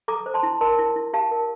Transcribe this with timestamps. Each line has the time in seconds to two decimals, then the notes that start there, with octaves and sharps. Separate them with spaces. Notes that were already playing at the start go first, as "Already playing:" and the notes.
0.08 A4 A#5 D6
0.26 C5
0.34 A5 C6
0.43 E4
0.61 A#4 A5 C6
0.79 E4
0.96 E4
1.13 G4 F5 A5
1.31 A#4